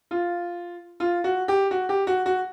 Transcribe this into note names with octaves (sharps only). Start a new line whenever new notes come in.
F4
F4
F#4
G4
F#4
G4
F#4
F#4